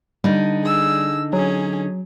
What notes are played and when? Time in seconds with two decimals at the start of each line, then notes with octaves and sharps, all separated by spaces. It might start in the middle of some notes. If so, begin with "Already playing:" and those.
0.24 D3 G3 D#4
0.63 G#4 E6
1.33 F#3 C#4 G#4